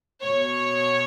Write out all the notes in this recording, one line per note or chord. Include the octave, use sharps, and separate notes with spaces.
B2 C#5